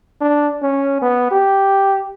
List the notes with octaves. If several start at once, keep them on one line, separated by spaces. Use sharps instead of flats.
D4
C#4
B3
G4